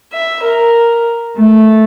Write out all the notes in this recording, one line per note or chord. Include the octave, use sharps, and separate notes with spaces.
E5
A#4
A3